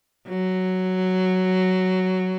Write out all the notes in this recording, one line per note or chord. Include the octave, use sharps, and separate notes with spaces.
F#3